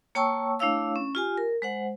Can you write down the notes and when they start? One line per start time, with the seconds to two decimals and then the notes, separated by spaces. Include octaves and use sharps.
0.15 A#3 C#5 G5 A5 C#6 E6
0.59 A3 D4 E4 C#5 F5 E6
0.96 C#4
1.15 F4 G4 G#5
1.38 A#4
1.62 G#3 C5 F#5